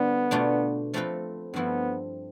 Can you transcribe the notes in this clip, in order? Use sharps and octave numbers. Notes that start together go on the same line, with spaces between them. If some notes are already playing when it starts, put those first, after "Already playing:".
Already playing: D3 G3 B3 D4 A4 C5
B2 A3 D4 F4
F3 A3 C4 F4 B4
G2 F3 A3 B3 C4 E4